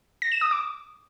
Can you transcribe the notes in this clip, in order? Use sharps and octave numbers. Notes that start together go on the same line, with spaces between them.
A#6
E7
D#6
D6